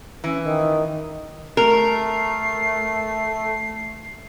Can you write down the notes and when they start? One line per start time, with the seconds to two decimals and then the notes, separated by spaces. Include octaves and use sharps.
0.24 E3 C#4
0.44 D#3
1.57 A3 A#4 C7